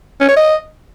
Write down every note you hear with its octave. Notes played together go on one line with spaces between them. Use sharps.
C#4
C#5
D#5